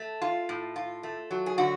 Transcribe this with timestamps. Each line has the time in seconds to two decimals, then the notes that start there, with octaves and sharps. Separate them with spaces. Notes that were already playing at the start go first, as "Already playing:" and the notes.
Already playing: A3
0.22 F4
0.49 A2
0.76 F4
1.03 A3
1.31 F#3
1.46 G#4
1.58 D3 F#4